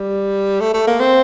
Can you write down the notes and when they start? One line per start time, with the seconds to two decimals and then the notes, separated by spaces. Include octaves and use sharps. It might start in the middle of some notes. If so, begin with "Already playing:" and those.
Already playing: G3
0.61 A3
0.74 A3
0.87 A#3
1.00 C4